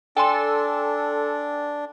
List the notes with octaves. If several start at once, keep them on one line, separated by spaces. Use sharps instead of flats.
D4 A4 G5 G#5 C6